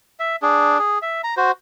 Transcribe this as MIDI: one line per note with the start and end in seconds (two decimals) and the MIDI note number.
0.20 0.36 76
0.42 0.78 62
0.42 0.78 68
0.79 0.99 68
1.02 1.21 76
1.24 1.34 82
1.37 1.51 66
1.37 1.51 72